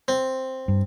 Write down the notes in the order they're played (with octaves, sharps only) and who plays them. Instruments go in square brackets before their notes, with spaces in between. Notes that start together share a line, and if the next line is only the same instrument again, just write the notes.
[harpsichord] C4
[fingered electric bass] G2